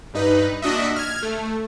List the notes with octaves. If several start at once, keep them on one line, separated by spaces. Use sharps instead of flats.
G2 D#4 B4
A#2 D4 F#4 D#5 E5
F6 G#6
A3